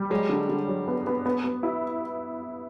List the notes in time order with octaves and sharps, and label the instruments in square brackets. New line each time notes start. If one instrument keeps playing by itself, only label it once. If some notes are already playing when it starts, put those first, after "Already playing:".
Already playing: [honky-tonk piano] G3
[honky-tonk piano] F#3 [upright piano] G#3
[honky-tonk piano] D3
D3
F#3
B3
B3
B3
B3
E4